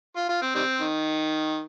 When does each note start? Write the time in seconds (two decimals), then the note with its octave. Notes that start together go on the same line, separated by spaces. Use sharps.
0.16 F4
0.29 F4
0.42 C4
0.55 D#3 G3 C4
0.81 D#3